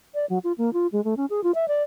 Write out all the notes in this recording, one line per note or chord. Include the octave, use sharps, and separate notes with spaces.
D5
F#3
F4
A#3
F4
G#3
A3
C#4
G#4
F4
E5
D5